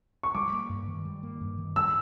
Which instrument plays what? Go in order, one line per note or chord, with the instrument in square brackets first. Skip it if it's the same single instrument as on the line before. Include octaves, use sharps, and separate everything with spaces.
[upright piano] C#6
[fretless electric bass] G3 [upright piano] D6
[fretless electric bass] A#3
G2
D#3
G3
A#3
G2
D#3
[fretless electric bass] G3 [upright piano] E6